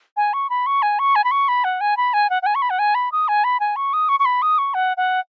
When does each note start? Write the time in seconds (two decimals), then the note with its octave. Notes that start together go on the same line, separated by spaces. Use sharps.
0.17 G#5
0.33 C#6
0.50 B5
0.66 C#6
0.82 G#5
0.99 C#6
1.15 G#5
1.24 B5
1.31 C#6
1.48 B5
1.64 F#5
1.81 G#5
1.97 B5
2.13 G#5
2.30 F#5
2.42 F#5
2.46 G#5
2.55 C#6
2.62 B5
2.70 F#5
2.79 G#5
2.95 B5
3.12 D#6
3.28 G#5
3.44 B5
3.60 G#5
3.76 C#6
3.93 D#6
4.09 C#6
4.19 C#6
4.25 B5
4.42 D#6
4.58 C#6
4.74 F#5
4.97 F#5